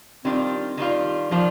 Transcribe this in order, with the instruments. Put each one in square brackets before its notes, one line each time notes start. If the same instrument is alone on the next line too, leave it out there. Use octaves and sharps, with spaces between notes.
[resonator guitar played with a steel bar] D#3 G3 D4 F4 [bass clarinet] C4
[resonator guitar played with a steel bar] D#3 G3 D4 F4
[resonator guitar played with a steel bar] D#3 G3 D4 F4 [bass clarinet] F3